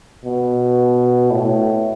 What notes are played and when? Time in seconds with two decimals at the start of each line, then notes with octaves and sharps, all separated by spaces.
0.25 B2
1.30 A2